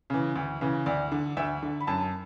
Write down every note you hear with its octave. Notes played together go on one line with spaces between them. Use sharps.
C#3 E3
D2
C#3 E3
D2 D5
D3
D2 E5
D3
B5
F#2 A5